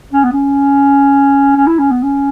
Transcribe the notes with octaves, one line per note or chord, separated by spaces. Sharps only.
C#4
B3
C#4
C#4
E4
C#4
B3
C#4